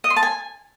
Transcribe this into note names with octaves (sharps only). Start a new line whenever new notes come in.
D#5
C6
A5
G#5